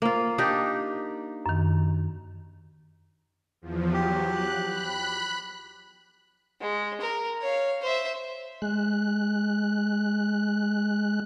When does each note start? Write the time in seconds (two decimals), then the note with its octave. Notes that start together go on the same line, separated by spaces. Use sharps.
0.02 A#3 F4 C5
0.38 D4 D#4 G4
1.46 F#2 D#3
3.62 E2 F3
3.93 F#3 G4
4.28 F#6
4.67 B5 F#6
6.61 G#3
7.01 A#4
7.42 C#5 F5
7.82 C5 E5
8.62 G#3 F#6